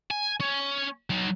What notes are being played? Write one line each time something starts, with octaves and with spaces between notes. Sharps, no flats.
G#5
C#4
F#3 D#4